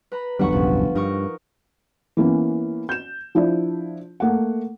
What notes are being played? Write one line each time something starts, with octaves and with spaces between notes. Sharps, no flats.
B4 A#5 B5
G1 E2 F#3 G3 B4 F#5 C#6
D#1 C2 F#2 F3
G2 D#4 A#4 C#6
E3 A#3 B3 C#4
G6 E7
F3 D4 E4
A3 A#3 F#5